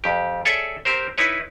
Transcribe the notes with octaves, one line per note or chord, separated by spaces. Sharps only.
F2 G4
G#4 A4 C#5 D5 E5
C4 G4 A#4 C5
D#4 E4 B4 C#5